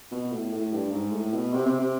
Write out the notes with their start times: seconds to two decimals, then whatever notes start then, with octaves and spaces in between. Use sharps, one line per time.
0.11 B2
0.31 A2
0.52 A2
0.73 G2
0.92 G#2
1.12 A2
1.33 B2
1.53 C3
1.66 C3
1.80 C3